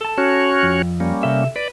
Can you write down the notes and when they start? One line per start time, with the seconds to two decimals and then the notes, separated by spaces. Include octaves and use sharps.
0.01 A4 A5
0.18 C#4 F#4 C#5
0.63 F2
1.00 G3 A#3 C#4
1.23 C3 A4 E5
1.56 B4 D5